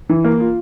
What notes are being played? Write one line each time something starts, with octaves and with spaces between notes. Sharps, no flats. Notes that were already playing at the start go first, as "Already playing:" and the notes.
E3
A#3
F4